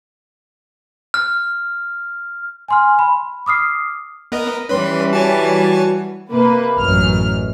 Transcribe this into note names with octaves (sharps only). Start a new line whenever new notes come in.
F6
G#5 C6 F6
B5
D6 D#6 F6 C7
B3 A#4 D#5
E3 G3 C#4 B4 C6
F#4 C#5 G#5 A5
C3 A#3 B4
A1 F#2 F6